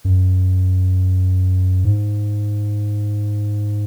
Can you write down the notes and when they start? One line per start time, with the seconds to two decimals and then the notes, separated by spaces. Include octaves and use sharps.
0.05 F#2
1.84 G#2